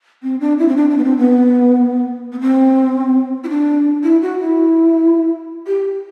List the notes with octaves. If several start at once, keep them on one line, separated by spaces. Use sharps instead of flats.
C4
D4
E4
C4
D4
D4
B3
C4
B3
B3
C4
E4
D4
E4
F#4
E4
G4